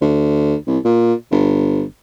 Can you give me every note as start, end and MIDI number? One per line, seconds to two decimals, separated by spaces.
0.02 0.55 38
0.67 0.78 36
0.85 1.14 46
1.31 1.84 31